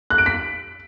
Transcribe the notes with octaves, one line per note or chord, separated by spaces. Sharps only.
F#6
D7
B6